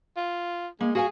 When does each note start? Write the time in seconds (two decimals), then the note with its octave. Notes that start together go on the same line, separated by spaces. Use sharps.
0.17 F4
0.81 G#3 A#3
0.95 F#4 G#4 F5 G#5